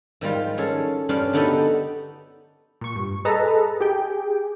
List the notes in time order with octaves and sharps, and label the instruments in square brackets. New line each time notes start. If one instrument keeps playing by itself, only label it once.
[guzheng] G#2 D#3 G3 F4
C#4 G#4 A4
G2 C#4 D4 F4 F5
D3 B3 D#4 F#4 G4 A4
[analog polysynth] A#2 C#6
G2
G#4 A4 B4 D#5 A5 A#5
G4 G#4 G5